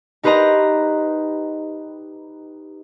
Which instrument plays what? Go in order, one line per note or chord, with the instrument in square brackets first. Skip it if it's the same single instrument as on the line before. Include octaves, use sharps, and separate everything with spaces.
[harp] D#4 G4 B4 C5 D#5 A#5